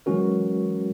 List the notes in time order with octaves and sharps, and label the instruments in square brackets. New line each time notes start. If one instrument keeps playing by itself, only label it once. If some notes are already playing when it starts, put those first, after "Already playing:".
[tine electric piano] E3 F#3 G#3 C#4 F#4 A#4